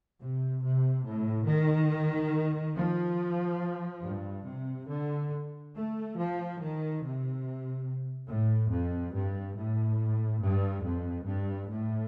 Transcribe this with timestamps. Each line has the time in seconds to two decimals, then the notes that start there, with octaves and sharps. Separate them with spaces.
0.21 C3
0.64 C3
1.06 A2
1.48 D#3
2.76 F3
4.04 G2
4.46 C3
4.89 D3
5.74 A3
6.17 F3
6.59 D#3
7.01 C3
8.29 A2
8.71 F2
9.14 G2
9.56 A2
10.42 G2
10.84 F2
11.26 G2
11.69 A2